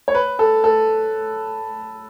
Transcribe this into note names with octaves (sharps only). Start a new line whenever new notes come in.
C#5
B4
A4
A4